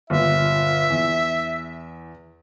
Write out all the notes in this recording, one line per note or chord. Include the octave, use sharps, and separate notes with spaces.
G1 A#2 E5
E2